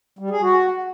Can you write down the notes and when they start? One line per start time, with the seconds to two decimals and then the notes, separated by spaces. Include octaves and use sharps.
0.19 G3
0.30 G#4
0.42 F#4